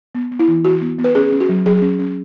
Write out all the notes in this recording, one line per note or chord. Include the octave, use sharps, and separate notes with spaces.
B3
B3
E4
E3
E3 F#4
B3
B3
B4
C#4 G#4
C#4
F#4
F#3
F#3 G#4
C#4
C#4